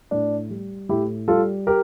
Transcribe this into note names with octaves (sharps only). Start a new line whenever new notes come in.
A2 D4
G3
A2 E4 G4
G3 F4 A4
G4 A#4